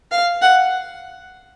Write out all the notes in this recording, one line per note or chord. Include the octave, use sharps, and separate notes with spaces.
F5
F#5